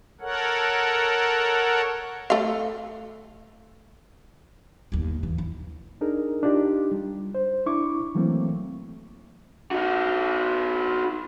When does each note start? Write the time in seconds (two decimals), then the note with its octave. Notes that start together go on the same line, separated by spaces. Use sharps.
0.21 A4 A#4 C#5 F#5
2.30 A3 F5
4.92 G1 D#2
5.23 E3
5.38 E4
6.01 D4 D#4 G#4 A#4
6.43 D4 D#4 F4 G4
6.91 G3
7.35 C5
7.66 D4 E4 C#6 D6
8.15 E3 F#3 A3 A#3 C4
9.71 D#4 F#4